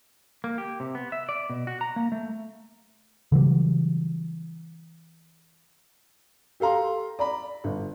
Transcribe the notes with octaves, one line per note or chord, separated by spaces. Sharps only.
A#3
G4
C3
B3
E5
D5
B2
F#4
A#5
A#3
A3
C#3 E3 F#3 G3
G4 A4 F5 A#5 C6
D5 A#5 B5
G1